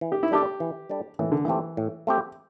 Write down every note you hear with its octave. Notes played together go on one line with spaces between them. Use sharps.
E3
G4
E4
G3 D4 G4 A4 D5
E3
G3 D4 A4 D5
A2 E3
D3
E3 A3 C4 G4
A2
A3 C4 G4